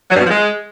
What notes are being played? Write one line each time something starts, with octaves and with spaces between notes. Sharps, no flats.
F#3
G2
B2
F3
G#3